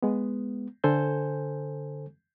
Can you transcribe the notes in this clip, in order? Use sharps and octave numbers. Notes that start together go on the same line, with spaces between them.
G#3 B3
D3 A4 C5 G#5 G6